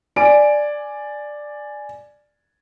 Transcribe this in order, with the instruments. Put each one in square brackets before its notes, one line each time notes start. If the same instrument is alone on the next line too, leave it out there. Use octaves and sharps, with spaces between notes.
[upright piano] D5 G#5 D7